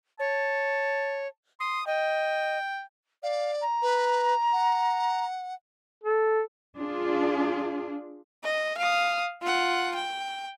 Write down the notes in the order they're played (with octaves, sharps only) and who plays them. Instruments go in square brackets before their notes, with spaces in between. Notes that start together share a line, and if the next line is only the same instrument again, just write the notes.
[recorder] C#5 [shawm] A5
[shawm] C6 [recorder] D#6
[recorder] D#5 [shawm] G5
[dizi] D5 [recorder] F5
[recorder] A#5
[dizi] B4
F#5
[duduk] A4
[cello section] D4 F4 G#4
[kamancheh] D#5
F5 D#6
F4 F#5
G5